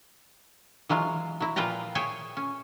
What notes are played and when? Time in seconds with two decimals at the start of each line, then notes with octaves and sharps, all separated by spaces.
0.89 E3 F#3 G#3 F4
1.40 F#3 E4
1.56 A#2 F3 F4 B4 G5 A#5
1.95 G#4 C#5 E5 G5 G#5
2.37 C#4